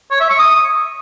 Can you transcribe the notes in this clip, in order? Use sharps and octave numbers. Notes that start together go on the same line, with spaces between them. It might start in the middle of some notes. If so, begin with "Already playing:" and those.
C#5
E5
C#6
D#6